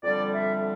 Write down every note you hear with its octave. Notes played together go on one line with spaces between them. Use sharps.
F2 D3 G3 D5
E5